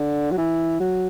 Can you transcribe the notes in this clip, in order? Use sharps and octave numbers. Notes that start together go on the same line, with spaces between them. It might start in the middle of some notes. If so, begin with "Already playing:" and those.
Already playing: D3
F#3
E3
F#3